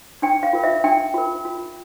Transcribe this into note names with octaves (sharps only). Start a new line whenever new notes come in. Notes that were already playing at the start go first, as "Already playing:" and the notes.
D4 G5
F5
F4 A#4
E5
D4 G5
F4 A#4
F4